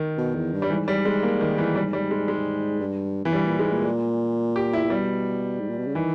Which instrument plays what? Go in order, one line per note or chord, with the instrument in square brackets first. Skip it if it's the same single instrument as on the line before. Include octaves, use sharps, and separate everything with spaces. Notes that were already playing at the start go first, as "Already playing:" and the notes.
Already playing: [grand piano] D#3
[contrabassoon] B2
E2
G2
[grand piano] G3
[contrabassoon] G#2 [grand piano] E3
[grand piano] G3
G#3
A#3
D#3
E3
G3
G3
G#3
G#3
[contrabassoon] G2
[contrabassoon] E2 [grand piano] E3
[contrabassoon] G2 [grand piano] G3
[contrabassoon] A#2
[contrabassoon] G#2 [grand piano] G#3
[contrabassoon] A#2
[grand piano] G4
E4
[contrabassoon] A#2
[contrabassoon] B2 [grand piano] G3
[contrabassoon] G#2
A#2
B2
C#3
[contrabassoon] D#3 [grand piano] E3